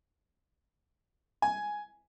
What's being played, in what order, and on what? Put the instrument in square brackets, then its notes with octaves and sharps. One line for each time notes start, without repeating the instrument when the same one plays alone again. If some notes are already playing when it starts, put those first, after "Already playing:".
[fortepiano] G#5